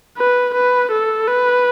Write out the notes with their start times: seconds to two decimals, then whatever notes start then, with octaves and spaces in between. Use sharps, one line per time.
0.17 B4
0.54 B4
0.91 A4
1.28 B4